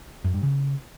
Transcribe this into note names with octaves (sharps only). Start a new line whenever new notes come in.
F#2
G2
C#3